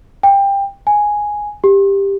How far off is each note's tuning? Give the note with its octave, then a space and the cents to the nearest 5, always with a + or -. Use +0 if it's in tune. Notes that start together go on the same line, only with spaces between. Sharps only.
G5 +20
G#5 +0
G4 +15